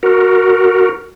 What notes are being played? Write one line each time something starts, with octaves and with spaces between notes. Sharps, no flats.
F#4 A#4